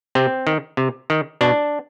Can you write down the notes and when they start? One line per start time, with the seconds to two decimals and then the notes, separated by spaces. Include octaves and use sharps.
0.15 C3 C4
0.47 D#3
0.77 C3
1.10 D#3
1.41 B2 D4